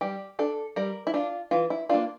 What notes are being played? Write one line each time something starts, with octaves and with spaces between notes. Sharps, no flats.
G3 G4
D4 A4
G3 A#4
E4
D4 F4
E3 F4
E4
A#3 D4 F4